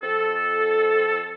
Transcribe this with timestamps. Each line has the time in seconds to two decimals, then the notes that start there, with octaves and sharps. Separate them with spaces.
0.03 F2 A4